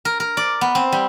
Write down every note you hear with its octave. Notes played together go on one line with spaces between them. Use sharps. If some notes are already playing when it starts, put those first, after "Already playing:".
A#4
A#4
D5
B3
C4
G3